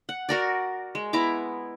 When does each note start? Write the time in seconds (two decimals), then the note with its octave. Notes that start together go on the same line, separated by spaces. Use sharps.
0.09 F#5
0.29 F#4 A#4 D5
0.95 G#3
1.13 B3 E4 A#5 D6